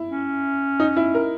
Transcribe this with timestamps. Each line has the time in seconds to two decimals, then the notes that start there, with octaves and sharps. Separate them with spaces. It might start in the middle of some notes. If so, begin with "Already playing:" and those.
Already playing: E4
0.11 C#4
0.80 D#4
0.97 E4
1.14 A#4